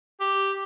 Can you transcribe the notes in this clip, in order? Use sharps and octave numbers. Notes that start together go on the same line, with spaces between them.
G4